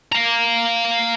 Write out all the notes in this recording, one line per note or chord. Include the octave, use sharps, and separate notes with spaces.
F5 A#5